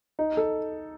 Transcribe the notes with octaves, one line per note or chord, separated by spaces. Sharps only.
D#4
A4